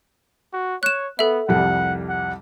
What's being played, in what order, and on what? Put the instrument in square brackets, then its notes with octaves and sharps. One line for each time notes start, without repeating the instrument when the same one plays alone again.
[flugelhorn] F#4
[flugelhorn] C#5 [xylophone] F#6 E7
[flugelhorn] B3 [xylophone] A4 E5
[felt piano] C2 F2 G3 [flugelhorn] F#5
[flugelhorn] F#5